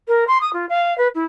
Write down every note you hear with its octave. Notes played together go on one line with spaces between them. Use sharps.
A#4
C6
D#6
F4
F5
B4
E4